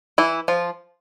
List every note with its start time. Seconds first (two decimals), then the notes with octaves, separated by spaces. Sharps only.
0.18 E3 E4
0.48 F3 F4